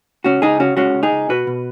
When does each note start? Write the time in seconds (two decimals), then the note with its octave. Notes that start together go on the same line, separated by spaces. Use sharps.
0.24 C#2 C#4 F#4
0.42 C#2 D#4 G#4
0.60 C#3 C#4 F#4
0.77 G#3 C#4 F#4
0.94 C#2
1.03 D#4 G#4
1.11 C#2
1.29 B2 F#4 B4
1.47 B2